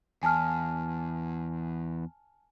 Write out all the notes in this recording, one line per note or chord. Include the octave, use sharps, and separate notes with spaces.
E2 G#5 A5 F6